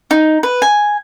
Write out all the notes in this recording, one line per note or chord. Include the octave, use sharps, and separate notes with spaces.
D#4
B4
G#5